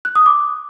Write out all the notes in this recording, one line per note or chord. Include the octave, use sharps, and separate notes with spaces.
F#6
D#6
D6